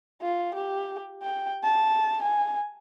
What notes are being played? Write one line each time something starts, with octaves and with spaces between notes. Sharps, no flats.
F4
G4
G5
A5
G#5